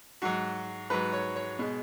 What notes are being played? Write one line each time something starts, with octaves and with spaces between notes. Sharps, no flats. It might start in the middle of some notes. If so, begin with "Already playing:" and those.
G#2 F#3 F#4
G#2 F#3 B4
C#5
C#5
B2 G#3